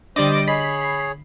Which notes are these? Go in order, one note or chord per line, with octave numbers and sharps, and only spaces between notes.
D3 G3 D4 C5 D5 D#5 D6
G#4 C#5 D#5 B5 C7